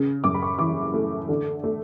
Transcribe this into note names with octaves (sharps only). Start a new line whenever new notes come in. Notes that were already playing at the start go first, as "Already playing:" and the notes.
Already playing: C#3
F#2 D6
B5
C#6
E3 D6
A3
D3
A3